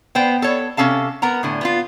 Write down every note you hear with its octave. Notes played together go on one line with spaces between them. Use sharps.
B3 C5 G5
A4 C#5
C3 C#4 A4 F5 A5
B3 A#4 F#5 A#5
A2 D3 G#5
B3 E4 F4